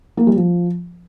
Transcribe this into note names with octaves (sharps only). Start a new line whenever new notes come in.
A#3
G3
F3